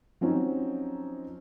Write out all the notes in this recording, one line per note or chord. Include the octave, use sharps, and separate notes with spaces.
F3 F#3 C4 C#4 D#4